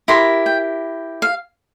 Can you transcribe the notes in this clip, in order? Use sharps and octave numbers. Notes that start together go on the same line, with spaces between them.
E4 G4 A#4 C6
G5
F5